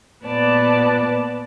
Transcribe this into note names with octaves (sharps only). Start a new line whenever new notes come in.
A#2 B3 B4 D5 A5